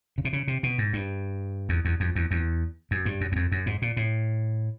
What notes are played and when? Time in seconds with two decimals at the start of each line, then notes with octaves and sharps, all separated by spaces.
0.18 C#3
0.25 C3
0.33 C#3
0.48 C3
0.63 B2
0.78 G#2
0.93 G2
1.69 E2
1.85 E2
2.00 F2
2.15 E2
2.31 E2
2.91 F#2
3.06 G2
3.21 F#2
3.32 E2
3.36 F2
3.52 F#2
3.66 G#2
3.82 A#2
3.97 A2